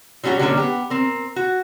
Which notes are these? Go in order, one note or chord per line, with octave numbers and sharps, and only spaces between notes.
F#3 G3 C#4 F#4 G4
D3 F#3 G#3 A#3 C#4 D4
B3 G4
C4 A#4
F#4